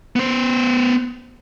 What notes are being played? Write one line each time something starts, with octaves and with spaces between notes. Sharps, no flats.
B3 C5